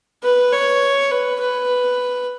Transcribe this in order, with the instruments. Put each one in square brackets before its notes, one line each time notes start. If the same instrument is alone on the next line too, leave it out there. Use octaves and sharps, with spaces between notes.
[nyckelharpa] B4
C#5
B4
B4